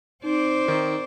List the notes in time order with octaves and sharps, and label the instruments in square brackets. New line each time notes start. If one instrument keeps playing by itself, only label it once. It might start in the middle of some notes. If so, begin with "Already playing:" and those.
[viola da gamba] C4 C5 D5 [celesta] D#4
[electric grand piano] D#3